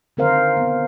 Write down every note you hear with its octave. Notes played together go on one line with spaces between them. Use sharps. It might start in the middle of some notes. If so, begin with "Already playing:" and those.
D3 D#3 C4 A#4 C5 F5
B3